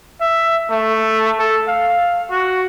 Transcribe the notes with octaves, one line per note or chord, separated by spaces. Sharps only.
E5
A3
A4
F5
F#4